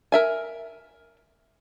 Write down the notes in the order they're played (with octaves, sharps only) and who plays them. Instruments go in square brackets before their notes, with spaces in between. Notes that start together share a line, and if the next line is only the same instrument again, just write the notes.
[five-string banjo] A#4 E5 G#5